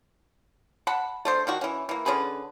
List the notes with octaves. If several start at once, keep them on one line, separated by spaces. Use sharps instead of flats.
F#5 A5 B5
A3 D4 C5
D#3 D4 F#4
E3 C#4
E3 A#3
D3 C#4 G#4 B4